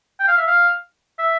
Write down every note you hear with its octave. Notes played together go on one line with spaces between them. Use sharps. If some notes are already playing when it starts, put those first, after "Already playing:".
G5
F5
E5
F5
E5